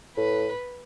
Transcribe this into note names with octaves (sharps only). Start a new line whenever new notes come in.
A2 B4